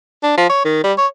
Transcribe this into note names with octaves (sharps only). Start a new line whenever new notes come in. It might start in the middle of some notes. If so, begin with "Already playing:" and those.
D4
F3
C#5
D#3
G3
C#5